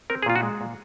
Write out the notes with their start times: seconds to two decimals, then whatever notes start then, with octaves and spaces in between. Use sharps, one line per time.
0.10 C4 A#4
0.23 G#4
0.26 A#2 F4
0.36 F#4
0.43 G#3
0.61 A#2